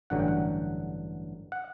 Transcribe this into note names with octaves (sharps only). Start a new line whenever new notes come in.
A1 G2 D3 F#3 F#5
G5
F#5
F#5